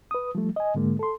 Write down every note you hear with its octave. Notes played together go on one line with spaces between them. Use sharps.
B4 D#6
F3 G3 A3
D#5 G#5
G#2 D3 G#3 A#3
A4 C6